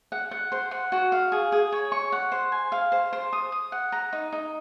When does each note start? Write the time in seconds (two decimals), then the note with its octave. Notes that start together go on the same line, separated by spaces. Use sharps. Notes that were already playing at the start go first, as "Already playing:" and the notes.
0.12 F#5
0.31 F#5
0.52 C5
0.71 F#5
0.92 F#4
1.12 F5
1.32 G#4
1.52 G#4
1.72 C#5
1.92 C#6
2.12 F#5
2.32 C5
2.52 G#5
2.72 F5
2.92 C5
3.13 C5
3.33 D#6
3.52 D#6
3.72 F#5
3.92 A#5
4.13 D#4
4.32 D#4